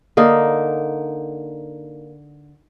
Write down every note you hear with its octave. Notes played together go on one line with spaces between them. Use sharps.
D3 A#3 D#4